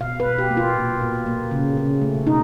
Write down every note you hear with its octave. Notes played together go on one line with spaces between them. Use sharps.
B2 F5
B4
B2
G4
A#3
F4
A#2
A#2
A#3
C#3
C#3
A3
B2 D#4